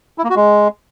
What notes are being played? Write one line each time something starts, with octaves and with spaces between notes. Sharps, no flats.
E4
A#3
F#4
G#3